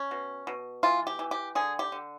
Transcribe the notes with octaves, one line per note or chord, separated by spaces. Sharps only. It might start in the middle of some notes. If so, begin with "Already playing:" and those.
Already playing: C#4
B2
B2
E3 F4
G4
E3
G4
D3 G#4
G4
D3